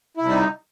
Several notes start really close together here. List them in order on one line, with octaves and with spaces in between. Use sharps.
E4 C3 G3 D#4